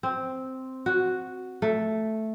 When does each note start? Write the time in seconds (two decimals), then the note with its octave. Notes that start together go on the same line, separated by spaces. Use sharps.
0.03 C4
0.86 F#4
1.62 A3